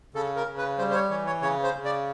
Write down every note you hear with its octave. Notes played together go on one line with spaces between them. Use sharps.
C#3 A4
A#4
C#3
B4
G3 C5
C5
C#5
E3 C#5
C#5
C#3 C#5
C5
C#3
D5